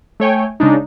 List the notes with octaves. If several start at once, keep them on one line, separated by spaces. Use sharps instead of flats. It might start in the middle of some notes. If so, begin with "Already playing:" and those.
A3 C#5 G5 G#5
C#3 G#3 D4 D#4